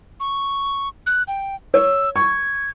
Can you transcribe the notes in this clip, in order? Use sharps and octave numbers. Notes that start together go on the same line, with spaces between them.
C#6
F#6
G5
C#5 E6
C#6 G#6